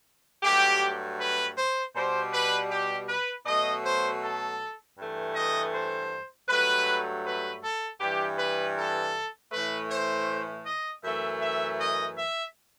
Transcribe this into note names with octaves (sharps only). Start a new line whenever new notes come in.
G2 F#3 A3 G4
B4
C5
B2 G3 C5
B4
G4
B4
B2 F#3 A3 D#5
C5
A4
G2 E3 A3
D#5
C5
G2 F#3 A3 B4
B4
A4
G2 E3 G3 G4
B4
A4
A2 E3 A3 B4
C5
D#5
F#2 E3 A3 E5
E5
D#5
E5